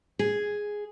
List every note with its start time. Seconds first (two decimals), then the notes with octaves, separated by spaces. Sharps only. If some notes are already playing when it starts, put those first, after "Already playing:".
0.19 G#4